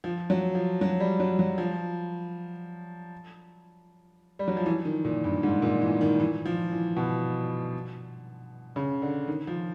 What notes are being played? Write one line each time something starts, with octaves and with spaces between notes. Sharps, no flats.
F3
F#3
F3
F#3
G3
F#3
F#3
F3
G3
F#3
F3
E3
D#3
A#2
G2
G#2
A#2
E3
D#3
E3
F3
E3
B2
C#3
D3
D#3
F3